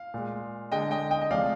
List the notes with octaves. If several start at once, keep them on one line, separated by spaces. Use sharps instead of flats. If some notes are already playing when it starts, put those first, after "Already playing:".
Already playing: F5
A#2 G#3
D3 G#3 D#5 G5
D#5 G5
D#5 G5
D#5
C3 F3 G#3 D5 F5